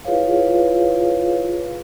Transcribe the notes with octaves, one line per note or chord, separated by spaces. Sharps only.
E4 F4 G#4 B4 C#5 F5